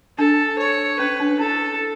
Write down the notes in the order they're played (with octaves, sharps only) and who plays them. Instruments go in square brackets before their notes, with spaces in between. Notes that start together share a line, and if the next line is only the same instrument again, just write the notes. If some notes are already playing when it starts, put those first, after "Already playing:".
[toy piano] D4 [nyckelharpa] A4
[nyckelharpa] C#5
[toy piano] C#4 [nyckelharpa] B4
[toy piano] D4
[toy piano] E4 [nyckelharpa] A4